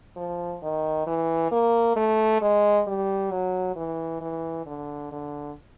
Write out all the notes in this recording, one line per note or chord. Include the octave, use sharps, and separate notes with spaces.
F3
D#3
E3
A#3
A3
G#3
G3
F#3
E3
E3
D3
D3